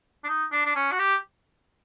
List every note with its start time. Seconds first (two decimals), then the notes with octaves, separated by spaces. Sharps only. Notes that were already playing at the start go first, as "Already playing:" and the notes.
0.24 D4
0.28 D#4
0.52 D4
0.66 D4
0.76 C#4
0.92 F#4
0.99 G4